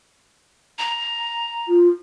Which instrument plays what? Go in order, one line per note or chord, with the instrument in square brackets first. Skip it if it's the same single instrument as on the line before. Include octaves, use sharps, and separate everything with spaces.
[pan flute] A#5
[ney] F4